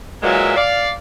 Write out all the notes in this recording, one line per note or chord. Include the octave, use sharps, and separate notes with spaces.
A#2 E3 F#3 G#3 A#3 E5
D5 F5